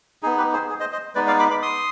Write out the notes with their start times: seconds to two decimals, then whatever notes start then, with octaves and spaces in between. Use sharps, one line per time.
0.23 D#4 G#4
0.26 B3
0.38 G4 B4
0.53 G#4 C5
0.70 G#4
0.80 C5 D#5
0.92 C5 D#5
1.15 G#3 B3 D#4 B4 D5
1.27 D5 F5
1.39 B5 D6
1.50 B5 D6
1.62 C6 D#6